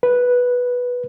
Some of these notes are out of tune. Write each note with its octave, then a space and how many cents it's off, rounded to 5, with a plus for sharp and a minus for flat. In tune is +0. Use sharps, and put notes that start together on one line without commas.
B4 -5